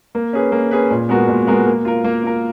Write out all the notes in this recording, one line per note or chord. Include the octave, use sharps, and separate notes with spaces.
A#3
C#4 G#4 B4
A#3
C#4 G#4 B4
A#2
G#3 B3 F#4 A#4
A#2
G#3 B3 F#4 A#4
A#3
F4 A#4
A#3
F4 A#4